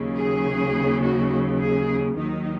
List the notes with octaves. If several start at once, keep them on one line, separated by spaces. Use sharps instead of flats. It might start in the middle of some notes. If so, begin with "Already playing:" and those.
Already playing: D#2 C#3 F#3
G#4
F#4
G#4
D#2 D#3 F#3 D#4